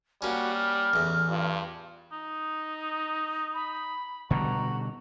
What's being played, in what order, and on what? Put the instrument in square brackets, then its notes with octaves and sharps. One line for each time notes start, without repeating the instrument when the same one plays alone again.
[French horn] G3 [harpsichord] A#3 C#4 [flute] F#4
[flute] F6
[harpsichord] A1 E2
[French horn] G2 [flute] F4
[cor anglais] D#4
[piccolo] B5
[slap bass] B2 D3 G3 [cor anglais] F#4 [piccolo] A#5